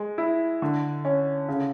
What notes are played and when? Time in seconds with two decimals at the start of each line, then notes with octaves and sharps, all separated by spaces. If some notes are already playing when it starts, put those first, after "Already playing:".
Already playing: G#3
0.18 E4
0.62 D3
1.05 C#4
1.49 C#3